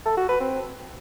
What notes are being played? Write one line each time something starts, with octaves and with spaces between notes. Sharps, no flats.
A4
F#4
B4
C4